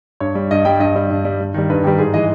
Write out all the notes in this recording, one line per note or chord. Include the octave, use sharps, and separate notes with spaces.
G2 C#5
G3
G2 D#5
G3 G5
G2 D#5
G3
G2
G3
G2
D#3 G3
G2 B4
D#3 G3 G4
G#2 G#4
E3 G#3 D#5